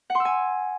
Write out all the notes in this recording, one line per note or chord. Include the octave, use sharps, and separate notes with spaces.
F#5
C6
E6
G#5